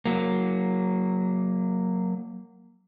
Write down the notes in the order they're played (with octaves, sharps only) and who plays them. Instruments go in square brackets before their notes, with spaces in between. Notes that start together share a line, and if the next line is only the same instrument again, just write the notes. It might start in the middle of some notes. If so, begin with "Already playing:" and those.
[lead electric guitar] F#3 A#3